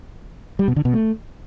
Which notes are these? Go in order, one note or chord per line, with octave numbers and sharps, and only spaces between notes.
G3
B2
D3
B2
A3